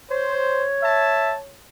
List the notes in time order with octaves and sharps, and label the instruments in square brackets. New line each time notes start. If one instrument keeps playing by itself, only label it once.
[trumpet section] C5 [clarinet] C#5
[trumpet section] E5 A5